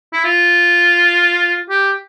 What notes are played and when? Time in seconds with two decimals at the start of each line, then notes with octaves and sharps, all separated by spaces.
0.13 E4
0.25 F4
1.70 G4